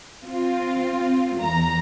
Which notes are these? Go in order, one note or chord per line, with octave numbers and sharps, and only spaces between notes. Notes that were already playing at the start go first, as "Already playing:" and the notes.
C4 F4
E2 A#5